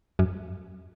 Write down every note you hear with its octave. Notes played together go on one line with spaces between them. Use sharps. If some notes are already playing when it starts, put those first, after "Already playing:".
F#2